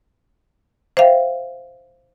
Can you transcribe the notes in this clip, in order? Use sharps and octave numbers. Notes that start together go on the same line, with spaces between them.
C5 E5 F5 G5